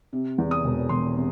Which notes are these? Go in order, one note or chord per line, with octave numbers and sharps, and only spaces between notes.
C3
E2
D#6
E1
E1 C6
C3